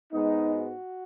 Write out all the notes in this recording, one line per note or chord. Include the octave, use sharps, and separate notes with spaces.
G#2 G#3 B3 D#4
F#4